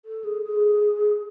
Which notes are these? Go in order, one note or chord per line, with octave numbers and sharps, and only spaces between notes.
A4
G#4
G#4